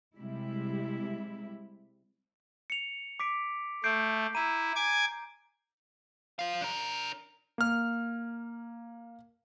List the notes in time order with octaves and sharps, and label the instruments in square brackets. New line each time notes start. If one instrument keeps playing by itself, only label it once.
[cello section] C3 G3 G#3 E4
[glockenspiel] C#7 F7
D6 B6 D7
[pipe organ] A3 [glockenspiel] G6 C7 D7
[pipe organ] E4 [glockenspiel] A#5 D#7
[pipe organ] G#5 D6 G#6
[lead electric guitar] C5 F5
D4 A#4
[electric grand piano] A#3 F6